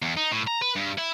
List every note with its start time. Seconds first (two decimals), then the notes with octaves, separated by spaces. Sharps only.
0.02 E2
0.17 D#4
0.32 A2
0.47 A#5
0.62 B4
0.76 G2
0.98 E4